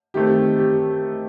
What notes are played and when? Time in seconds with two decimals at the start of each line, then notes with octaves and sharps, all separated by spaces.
0.14 D#3 A3 C4 G4
0.58 G4